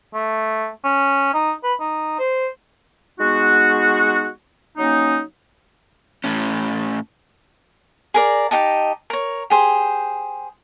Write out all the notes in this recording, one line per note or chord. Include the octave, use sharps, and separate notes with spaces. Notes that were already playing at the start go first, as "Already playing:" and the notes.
A3
C#4
D#4
B4
D#4
C5
G#3 B3 D#4 F#4
F#3 A#3 C#4 D#4
A2 C#4
G#4 A#4 D5
D#4 G4 D#5 A5
A#4 C#5
G4 G#4 C5